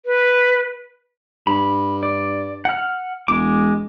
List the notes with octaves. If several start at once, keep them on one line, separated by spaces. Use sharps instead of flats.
B4
G2 B5
D5
F#5 F6
E1 G#3 D6